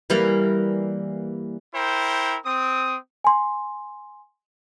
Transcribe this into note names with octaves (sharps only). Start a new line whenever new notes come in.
E3 G3 A#3
E4 A#4 C5 G5
C4 D#6
G#5 C6